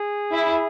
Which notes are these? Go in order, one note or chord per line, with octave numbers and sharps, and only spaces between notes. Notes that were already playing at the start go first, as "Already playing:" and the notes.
Already playing: G#4
E4